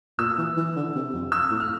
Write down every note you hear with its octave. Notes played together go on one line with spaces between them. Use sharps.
A#2 E6
E3
E3
D3
C3
F2
E6
A2
F6